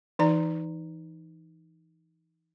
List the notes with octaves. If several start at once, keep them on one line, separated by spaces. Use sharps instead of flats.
E3 D#4 D5 A#5